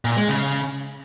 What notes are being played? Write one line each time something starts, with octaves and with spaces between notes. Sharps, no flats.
A#2
G#3
C#3